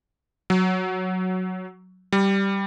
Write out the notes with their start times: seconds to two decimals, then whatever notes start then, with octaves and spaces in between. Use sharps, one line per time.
0.50 F#3
2.12 G3